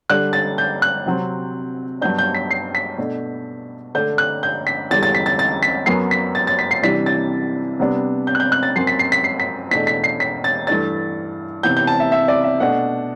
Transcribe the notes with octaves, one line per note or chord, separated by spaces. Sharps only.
D3 G3 D4 F#6
A6
G6
F#6
C3 F#3 C4
G2 F#3 B3 D4 G6
G6
B6
C7
B6
B2 A3 D4
D3 A3 D4 G6
F#6
G6
B6
E2 D3 G3 A6
A6
B6
A6
A6
B6
F#2 F#3 B3 C7
B6
A6
A6
B6
C7
C3 E3 G3 D4 B6
A6
C3 G3 B3 D4
G6
F#6
G6
F#6
A6
F#2 F#3 C4 C7
B6
C7
B6
C7
B6
E2 B2 A3 D4 B6
B6
C7
B6
A6
G2 E3 A3 D4 A6
C3 E3 B3 G6
G6
A5
E5
E5
D5
E5
B2 A3 D4 F#5